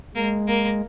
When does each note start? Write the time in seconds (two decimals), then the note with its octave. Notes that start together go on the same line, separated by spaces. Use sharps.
0.15 G#3 A#3
0.47 A#3